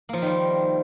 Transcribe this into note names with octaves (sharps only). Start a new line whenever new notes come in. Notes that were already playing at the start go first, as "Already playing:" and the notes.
D#3 F3 G3 A#3 F4